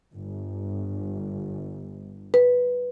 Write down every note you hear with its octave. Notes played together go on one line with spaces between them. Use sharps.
G1
B4